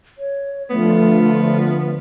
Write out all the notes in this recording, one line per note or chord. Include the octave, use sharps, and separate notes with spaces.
C#5
D3 F3 A3 B3 F4